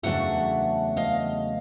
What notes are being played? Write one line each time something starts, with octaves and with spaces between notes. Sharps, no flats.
E2 C#3 F#3 A3 D4 E5 F#5
D#5 F5